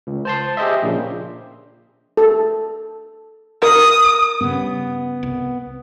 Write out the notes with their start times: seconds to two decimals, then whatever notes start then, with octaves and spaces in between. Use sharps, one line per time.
0.07 C#2
0.25 C5 A5 C6
0.57 G4 G#4 C5 D#5 E5
0.83 A#1 A#2 C#3
2.17 A4
3.63 A#4 D#6
4.41 G2 C#3 B3
5.23 C2